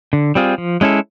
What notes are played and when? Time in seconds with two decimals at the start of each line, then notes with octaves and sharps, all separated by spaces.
0.13 D3
0.35 G3 C4 F4 G#4
0.58 F3
0.81 G#3 C#4 E4 A4